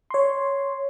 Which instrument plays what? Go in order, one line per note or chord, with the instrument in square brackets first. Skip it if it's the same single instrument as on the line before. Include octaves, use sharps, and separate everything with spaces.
[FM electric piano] C#5 C6